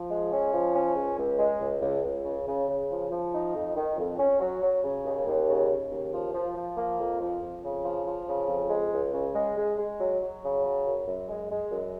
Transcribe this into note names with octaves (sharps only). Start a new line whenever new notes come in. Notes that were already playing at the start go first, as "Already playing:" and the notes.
Already playing: F3
G#3
C#4
F3
C#4
C#2
C#2
G#3
C#2
C#2
C#2
C#3
C#3
C#3
F3
F3
D#4
F2
D#3
F2
C#4
F#3
F#3
C#3
D#2
D#2
C#3
C#3
D#2
F3
F3
F3
A#3
F2
F3
F2
C#3
F3
F3
C#3
F2
G#3
C#2
C#3
G#3
G#3
G#3
F#3
F#3
C#3
F#3
F#2
F#2
G#3
G#3
F#2